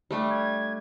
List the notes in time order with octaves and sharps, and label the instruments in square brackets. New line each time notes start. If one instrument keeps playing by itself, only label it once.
[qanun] G3 A3 D4
[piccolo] G#6